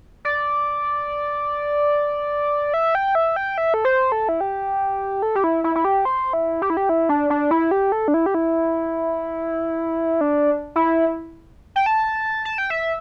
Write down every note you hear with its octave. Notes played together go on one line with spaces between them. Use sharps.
D5
E5
G5
E5
G5
E5
A4
C5
A4
E4
G4
A4
G4
E4
E4
E4
G4
C5
E4
G4
E4
G4
E4
D4
D4
E4
G4
A4
D4
E4
G4
E4
D4
E4
G5
A5
A5
G5
E5